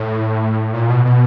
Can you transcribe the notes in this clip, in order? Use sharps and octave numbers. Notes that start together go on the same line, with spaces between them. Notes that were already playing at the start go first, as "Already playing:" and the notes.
Already playing: A2
A#2
B2
B2